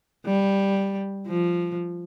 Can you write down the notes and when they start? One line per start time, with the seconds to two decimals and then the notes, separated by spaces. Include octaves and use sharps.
0.25 G3
1.27 F3